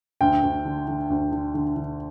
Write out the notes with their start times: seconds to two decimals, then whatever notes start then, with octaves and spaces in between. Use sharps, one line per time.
0.21 D2 G5
0.43 D2
0.65 D3
0.88 D3
1.10 D2
1.32 D3
1.54 D3
1.76 D3